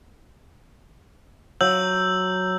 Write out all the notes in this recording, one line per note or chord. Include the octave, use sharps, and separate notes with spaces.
F#3 E6 G6 F#7